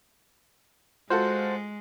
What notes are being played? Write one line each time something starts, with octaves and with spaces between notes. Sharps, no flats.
G#3 F4 F#4 A4 C5